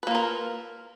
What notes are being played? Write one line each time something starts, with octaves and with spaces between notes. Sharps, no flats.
A#3 F4 A#4 B4